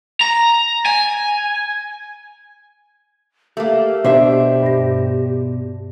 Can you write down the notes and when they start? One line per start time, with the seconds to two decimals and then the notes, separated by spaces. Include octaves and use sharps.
0.21 A#5
0.86 G#5
3.57 A3 A#3 G4
4.04 B2 D4 C5 E5
4.63 G2 A#6